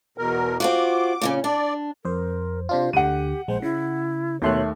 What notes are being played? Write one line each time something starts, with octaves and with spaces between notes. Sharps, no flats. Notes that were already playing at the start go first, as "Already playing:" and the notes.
E2 B2 A#4
C4 F4 F#4 D6
A#2 C#3 C#4
D4 D5
F2 A#4 C5
C3 D4 F4 C5
D2 D3 G4 F#5 D#7
A#1 G#3 C5
C#3 E4
D#2 B2 A3 C#5 C6 F#6